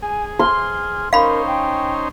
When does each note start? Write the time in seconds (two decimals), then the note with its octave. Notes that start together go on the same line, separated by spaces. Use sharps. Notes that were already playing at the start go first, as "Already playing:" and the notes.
0.02 G#4 G#5
0.39 C6 F6
1.13 C#4 D#4 A#4 C5 F5 B5
1.47 G5